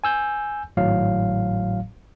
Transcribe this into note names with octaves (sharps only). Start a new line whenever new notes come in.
G#5 E6 G6
G#1 A2 F#3 F5